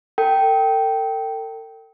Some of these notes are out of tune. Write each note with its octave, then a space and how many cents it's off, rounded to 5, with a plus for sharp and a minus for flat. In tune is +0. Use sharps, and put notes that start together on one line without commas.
A4 +45 G5 -10